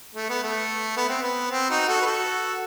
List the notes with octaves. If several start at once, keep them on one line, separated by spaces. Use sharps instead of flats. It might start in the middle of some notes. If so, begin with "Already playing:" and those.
A3
B3
A3
B3
C4
B3
C4
D#4 F#4
F#4 A4
B4
F#4 A4